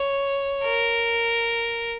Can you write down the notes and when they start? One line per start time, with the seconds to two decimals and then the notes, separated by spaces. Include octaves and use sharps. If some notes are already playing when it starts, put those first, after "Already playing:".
Already playing: C#5
0.64 A#4